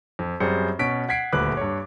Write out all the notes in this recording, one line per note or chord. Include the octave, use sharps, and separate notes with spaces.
F2
F#2 G3 C4 G#4 C5 C#7
B2 C#4 B6 D7
F#5 G#6 B6 C7 D7
D#1 D2 B4 D6 F#6
G2 C#5